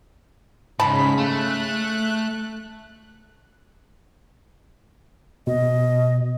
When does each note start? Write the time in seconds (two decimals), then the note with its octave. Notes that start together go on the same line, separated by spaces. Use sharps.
0.80 G#2 C#3 A5 B5 B6
1.18 A3 F#6
5.47 B2 D#5